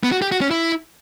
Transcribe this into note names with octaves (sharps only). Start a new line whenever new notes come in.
B3
F#4
G4
F#4
C#4
E4